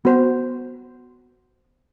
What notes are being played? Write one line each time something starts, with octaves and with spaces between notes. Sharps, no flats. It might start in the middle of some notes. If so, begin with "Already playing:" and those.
B3 F#4 C5